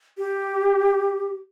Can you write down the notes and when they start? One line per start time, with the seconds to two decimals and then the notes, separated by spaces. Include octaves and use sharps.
0.18 G4